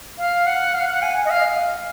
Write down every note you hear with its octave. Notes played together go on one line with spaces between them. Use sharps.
F5
F#5
F5
F#5
G#5
D#5
F5